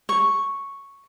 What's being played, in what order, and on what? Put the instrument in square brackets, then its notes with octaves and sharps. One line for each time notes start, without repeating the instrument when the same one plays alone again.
[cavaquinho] C#6